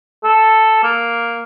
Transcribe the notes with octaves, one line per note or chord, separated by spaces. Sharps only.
A4
A#3